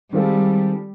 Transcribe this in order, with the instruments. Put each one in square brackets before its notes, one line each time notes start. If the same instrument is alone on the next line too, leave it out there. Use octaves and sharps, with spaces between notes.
[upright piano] D#3 G#3 C4 F4 A4 [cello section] G3